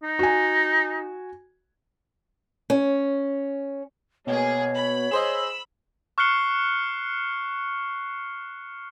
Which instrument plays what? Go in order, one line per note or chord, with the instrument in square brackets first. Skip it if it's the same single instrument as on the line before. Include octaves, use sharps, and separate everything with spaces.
[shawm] D#4
[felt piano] F#4 G#5
[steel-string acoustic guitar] C#4
[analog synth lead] B2 [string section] A#3 G#4 [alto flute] C#5
[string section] B5
[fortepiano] G#4 C5 D#5 [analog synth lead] E6
[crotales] C#6 F6 F#6 C7 C#7 G7